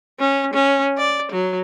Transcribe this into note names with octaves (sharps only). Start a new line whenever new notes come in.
C#4
C#4
D5
F#3